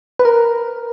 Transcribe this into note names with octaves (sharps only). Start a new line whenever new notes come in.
B4
A#4